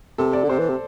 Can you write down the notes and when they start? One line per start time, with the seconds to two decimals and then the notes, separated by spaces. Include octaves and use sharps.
0.18 C3 A4
0.33 D5
0.44 D3
0.49 C3 C5
0.59 E3
0.69 C3